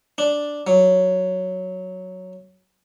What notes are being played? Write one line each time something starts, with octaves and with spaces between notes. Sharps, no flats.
D4
F#3